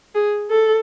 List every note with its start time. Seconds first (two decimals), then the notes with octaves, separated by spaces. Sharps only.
0.15 G#4
0.50 A4